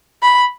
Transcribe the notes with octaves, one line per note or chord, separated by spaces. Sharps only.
B5